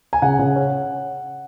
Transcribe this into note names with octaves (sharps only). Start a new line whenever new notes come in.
G#5
C#3 F#5
C#3
C#4